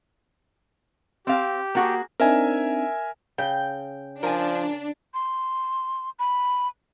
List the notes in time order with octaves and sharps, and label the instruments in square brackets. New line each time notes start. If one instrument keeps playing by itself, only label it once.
[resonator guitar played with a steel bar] C4 F5 [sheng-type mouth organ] G4
[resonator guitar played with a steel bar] A#3 F#4 G#4
[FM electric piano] C4 D4 D#4 [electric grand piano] A#4 E5 G#5
[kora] C#3 [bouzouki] G5
[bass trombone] F3 [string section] D4 [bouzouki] A#4 G#5
[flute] C6
B5